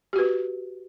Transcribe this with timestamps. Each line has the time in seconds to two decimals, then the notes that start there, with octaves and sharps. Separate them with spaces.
0.13 G4
0.16 F#4
0.18 B4